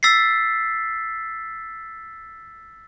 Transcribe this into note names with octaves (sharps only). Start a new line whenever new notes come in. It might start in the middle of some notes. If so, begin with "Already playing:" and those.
E6 A6 B6 C7